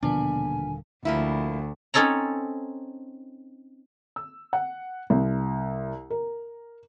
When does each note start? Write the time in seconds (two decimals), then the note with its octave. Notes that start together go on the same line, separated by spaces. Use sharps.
0.03 D#1 B2 D3 F3 A#3 B3 D4 G#5
1.05 D2 F3 A#3 E4
1.94 C4 C#4 D#4 A4 C#5 A#5
4.16 E6
4.53 F#5
5.10 C2
6.10 A#4